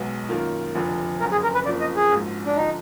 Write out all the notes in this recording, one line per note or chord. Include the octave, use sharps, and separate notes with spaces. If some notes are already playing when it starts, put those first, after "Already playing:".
Already playing: B1 B2 G#3 B3
F#2 D#3 A#3 F4
F1 F2 D3
F#1 F#2 D3 A#4
G#4
A#4
B4
F#1 F2 F3 A#3 D5
D#5
G#4
A#1 G#2 F#3
D4
D3 F3 D#4